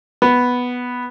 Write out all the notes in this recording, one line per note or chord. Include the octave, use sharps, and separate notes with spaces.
B3